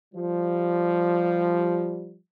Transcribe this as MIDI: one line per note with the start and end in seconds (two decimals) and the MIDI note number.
0.14 2.17 53
0.14 2.17 55